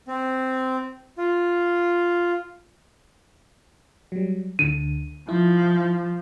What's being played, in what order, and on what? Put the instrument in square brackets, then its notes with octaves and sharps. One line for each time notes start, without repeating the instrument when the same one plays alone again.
[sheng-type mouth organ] C4
F4
[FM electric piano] F#3 G3
[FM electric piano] D2 D3 [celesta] D#7
[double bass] F3 [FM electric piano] E4